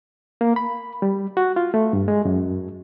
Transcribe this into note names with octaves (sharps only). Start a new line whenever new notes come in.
A#3
B5
G3
F#4
F4
A3
G2
G#3
F#2